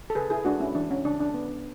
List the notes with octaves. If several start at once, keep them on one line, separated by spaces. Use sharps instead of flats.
A4
C#3 G#4 B4
E4 G#4
G#3 D4 F#4
C#4 E4
E3 D4
C#4
C#3 D4
D4
B3